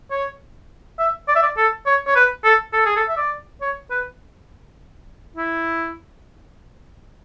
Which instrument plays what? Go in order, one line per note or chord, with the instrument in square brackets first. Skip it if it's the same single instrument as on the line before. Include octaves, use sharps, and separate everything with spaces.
[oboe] C#5
E5
D5
E5
D5
A4
C#5
C#5
B4
A4
A4
G#4
A4
E5
D5
C#5
B4
E4